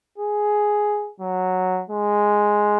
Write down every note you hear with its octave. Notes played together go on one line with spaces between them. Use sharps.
G#4
F#3
G#3